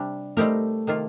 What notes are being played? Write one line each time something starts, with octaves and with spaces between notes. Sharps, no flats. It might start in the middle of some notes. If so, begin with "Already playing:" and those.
Already playing: C3 G3 D4
G3 A3 C4 D#4 G4 A#4
C3 D#3 A#3 F4